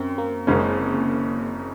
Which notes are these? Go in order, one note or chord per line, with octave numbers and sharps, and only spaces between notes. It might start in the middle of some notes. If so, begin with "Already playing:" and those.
Already playing: F#2 C4 C#4
A#3
F#1 F#2 C#3 G#3 C#4